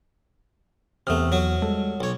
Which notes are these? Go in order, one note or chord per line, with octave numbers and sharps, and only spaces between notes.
E2 C3 A3 D#6 F6
F#3 F#4
G3 G#3 A4
B1 C#5